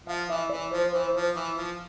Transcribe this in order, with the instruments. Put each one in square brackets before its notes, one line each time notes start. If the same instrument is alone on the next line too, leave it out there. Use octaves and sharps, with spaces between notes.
[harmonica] F3 [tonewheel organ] F5
[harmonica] E3 [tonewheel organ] E5
[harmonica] E3 [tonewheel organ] D5
[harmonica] F3 [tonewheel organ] C5
[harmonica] E3
F3
E3
F3